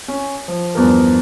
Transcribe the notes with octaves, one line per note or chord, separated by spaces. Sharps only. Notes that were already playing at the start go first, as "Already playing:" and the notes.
C#4
F3
E2 G2 F3 A#4